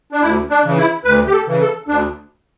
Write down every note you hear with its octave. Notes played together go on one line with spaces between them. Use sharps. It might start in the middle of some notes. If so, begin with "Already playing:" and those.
D4
D2 E4
D4
C#3 E3
E4
D2 B4
G4
A4
C#3 E3
A4
D2 D4